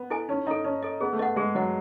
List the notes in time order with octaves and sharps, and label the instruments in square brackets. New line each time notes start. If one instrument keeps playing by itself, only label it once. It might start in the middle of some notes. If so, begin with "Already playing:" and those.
Already playing: [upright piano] B3
[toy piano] E4 A4 D#5 G#5
[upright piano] C#4 [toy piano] D#4
[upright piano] D#4 [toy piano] A4 D#5
[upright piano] C#4 [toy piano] D#4
[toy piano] A4 D#5
[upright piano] B3 [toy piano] G#4
[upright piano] A3
[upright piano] B3 [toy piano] D#5 F#5
[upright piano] G#3 [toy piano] G#4
[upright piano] F#3 [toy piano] D#5 F#5